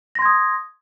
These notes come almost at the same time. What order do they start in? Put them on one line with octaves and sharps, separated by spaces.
A#6 C6 G#6 D#6